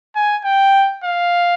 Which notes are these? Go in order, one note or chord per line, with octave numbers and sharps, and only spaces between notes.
G#5
G5
F5